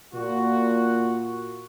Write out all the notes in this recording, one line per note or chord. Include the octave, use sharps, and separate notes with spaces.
A#2 F#4